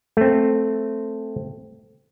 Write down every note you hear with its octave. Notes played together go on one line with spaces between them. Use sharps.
A3 C4